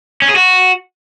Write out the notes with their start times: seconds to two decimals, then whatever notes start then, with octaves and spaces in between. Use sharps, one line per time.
0.22 C#4
0.29 G#4
0.36 F#4